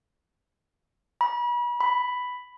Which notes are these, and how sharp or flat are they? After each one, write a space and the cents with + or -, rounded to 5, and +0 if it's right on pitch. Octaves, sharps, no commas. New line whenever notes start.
B5 -35
B5 +5